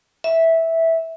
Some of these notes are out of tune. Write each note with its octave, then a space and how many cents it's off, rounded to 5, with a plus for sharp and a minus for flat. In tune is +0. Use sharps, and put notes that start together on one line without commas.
E5 -10